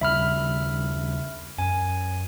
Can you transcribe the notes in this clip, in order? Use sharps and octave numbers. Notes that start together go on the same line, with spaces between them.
D#2 C#3 G3 E5 B5 F6
F#2 G#5